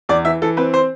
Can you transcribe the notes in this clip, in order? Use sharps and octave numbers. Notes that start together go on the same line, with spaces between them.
E2 D5
E3 E5
E3 A4
C4 B4
C5